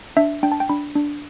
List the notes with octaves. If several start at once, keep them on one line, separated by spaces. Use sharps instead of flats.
D4 E5
D4 G5
A5
G5
D4 B5
D4